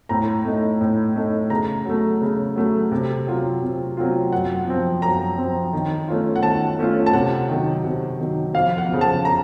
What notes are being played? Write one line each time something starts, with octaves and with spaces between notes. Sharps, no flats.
A2 A#5
A3 D#4
A2
A3 D#4
C#3 A#5
F#3 A3
C#3
F#3 A3
C3
F#3 C4 F4
C3
F#3 C4 F4
F#2 F#5
F3 C4
F#2 A#5
F3 C4
D#3
A3 C#4 F4
F#5
D#3 A5
A3 C#4 F4
A5
C3 F#5
D#3 F#3
C3
D#3 F#3
F2 F5
F#5
C#3 F3
A5
A#5